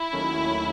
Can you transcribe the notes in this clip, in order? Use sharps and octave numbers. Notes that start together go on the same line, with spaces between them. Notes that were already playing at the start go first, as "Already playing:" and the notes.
Already playing: E4
D#2 D#3 F#3 A3 C#4